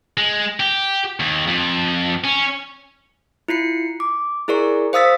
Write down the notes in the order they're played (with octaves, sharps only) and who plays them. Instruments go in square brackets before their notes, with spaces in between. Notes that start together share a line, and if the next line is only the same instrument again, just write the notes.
[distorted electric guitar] G#3
G4
D#2
F2
C#4
[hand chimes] E4 F4 C7 C#7
D6
E4 G#4 A#4 D5 C#6
C5 F5 D#6 E6 A6 B6